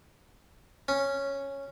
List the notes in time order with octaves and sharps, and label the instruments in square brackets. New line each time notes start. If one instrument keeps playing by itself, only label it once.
[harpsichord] C#4